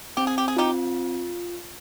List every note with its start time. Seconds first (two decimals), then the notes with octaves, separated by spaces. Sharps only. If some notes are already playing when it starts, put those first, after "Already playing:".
0.17 C4 G4
0.27 G#4
0.38 G4
0.48 G#4
0.57 D#4 F4 G4